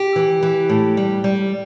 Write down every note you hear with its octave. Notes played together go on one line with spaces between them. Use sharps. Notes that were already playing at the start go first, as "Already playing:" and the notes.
Already playing: G4
E3
E3
A2
G3
G3